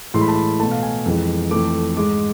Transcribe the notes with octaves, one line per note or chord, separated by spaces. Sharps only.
A2 E3 G#3 C6
B5
A5
B5
B2 A3 A5
F5
G#5
F2 E3 G#3
F2 E3 A3 D6
G#2 G#3 D6